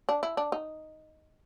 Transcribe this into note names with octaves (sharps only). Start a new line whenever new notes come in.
D4
E4
D4
D#4